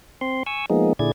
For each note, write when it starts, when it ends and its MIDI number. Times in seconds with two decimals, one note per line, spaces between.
0.21 0.43 60
0.21 0.43 84
0.46 0.66 80
0.46 0.66 85
0.46 0.66 88
0.70 0.93 53
0.70 0.93 56
0.70 0.93 58
0.70 0.93 59
0.70 0.93 63
0.70 0.93 68
0.99 1.12 46
0.99 1.12 50
0.99 1.12 64
0.99 1.12 68
0.99 1.12 74
0.99 1.12 92